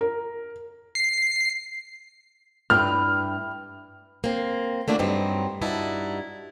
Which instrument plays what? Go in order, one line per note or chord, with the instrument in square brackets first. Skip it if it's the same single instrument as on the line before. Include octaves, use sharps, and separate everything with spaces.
[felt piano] A#4
[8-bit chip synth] C7
[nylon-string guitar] G2 B4 G5 [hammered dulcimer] G3 E4 G4 [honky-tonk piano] F6
[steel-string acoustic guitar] A#3 C4
A3 A#3 D4 E4 F#4
G2 F#3 C4 D#4
G2 D#4 E4 F#4 A5